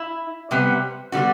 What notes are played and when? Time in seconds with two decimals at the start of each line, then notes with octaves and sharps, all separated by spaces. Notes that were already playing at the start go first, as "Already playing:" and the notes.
Already playing: E4
0.51 C3 G3 B3
1.12 D3 G3 B3 F#4